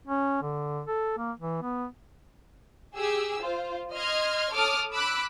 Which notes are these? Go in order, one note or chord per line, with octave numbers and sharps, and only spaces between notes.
C#4
D3
A4
A#3
E3
B3
G4 G#4 E6
F4 C5
D#5 C6 F6 G#6
A4 C#5 A5 D6 D#6 F6
B5 D6 E6 F#6